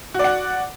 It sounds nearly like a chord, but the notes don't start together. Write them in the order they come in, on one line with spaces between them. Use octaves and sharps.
F#4 D5 F#5